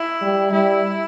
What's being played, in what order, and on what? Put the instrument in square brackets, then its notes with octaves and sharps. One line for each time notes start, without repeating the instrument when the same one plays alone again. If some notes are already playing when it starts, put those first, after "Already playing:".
Already playing: [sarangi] E4
[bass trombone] G3
[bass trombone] G3 [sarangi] E4